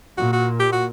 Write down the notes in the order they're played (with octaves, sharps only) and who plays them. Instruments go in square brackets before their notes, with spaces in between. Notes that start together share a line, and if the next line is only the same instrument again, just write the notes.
[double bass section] A#2 [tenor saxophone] F#4
[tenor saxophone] F#4
G4
F#4